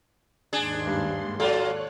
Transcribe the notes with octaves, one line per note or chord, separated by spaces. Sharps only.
D#2 G#2 D4 G#4 C6
G2
F#3 F4 A4 C#5 D5 F#6